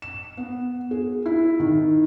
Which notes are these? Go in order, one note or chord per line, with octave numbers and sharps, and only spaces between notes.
E7
B3
G#4
E4
D#3